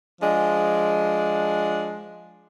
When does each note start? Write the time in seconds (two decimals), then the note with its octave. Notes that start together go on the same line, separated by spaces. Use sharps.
0.21 F3 G#3 D4